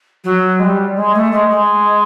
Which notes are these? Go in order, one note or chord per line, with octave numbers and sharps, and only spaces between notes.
F#3
G#3
G3
G#3
A3
G#3
G#3